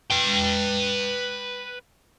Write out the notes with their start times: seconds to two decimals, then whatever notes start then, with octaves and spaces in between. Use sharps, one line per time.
0.10 B4 G5